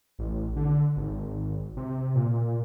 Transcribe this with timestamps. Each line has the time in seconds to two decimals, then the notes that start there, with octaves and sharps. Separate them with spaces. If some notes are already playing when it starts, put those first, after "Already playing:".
0.19 A1
0.56 D3
0.96 G#1
1.77 C3
2.15 A#2